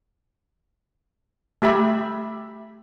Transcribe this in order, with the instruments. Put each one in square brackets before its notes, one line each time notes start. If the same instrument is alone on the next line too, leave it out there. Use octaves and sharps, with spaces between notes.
[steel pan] A3 G4 E5 B5